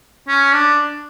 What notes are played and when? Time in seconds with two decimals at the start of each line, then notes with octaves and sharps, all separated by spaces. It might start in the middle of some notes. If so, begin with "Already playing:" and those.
0.28 C#4
0.53 D4